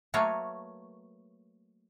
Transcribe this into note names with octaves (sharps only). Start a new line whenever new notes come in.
F#3 A3 A#3 B4 C#5